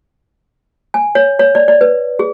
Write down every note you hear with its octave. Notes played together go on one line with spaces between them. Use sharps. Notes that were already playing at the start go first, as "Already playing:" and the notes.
G#5
C#5
C#5
D5
D5
B4
G#4